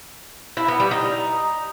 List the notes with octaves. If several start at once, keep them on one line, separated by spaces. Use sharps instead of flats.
E4
B3
G3
D#4